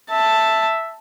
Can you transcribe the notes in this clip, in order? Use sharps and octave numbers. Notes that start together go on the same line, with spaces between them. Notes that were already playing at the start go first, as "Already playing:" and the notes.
E5 A5